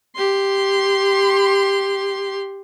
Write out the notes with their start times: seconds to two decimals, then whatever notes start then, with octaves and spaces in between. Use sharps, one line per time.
0.16 G4 C6